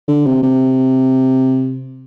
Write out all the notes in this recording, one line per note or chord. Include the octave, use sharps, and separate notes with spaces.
D3
C3
C3